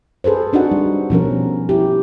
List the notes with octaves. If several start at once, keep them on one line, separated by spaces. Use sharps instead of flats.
G#4 A4 B4 C5
C4 D4 D#4 F#4 F#5
G3
B2 F3 C#4 A#4
E4 G4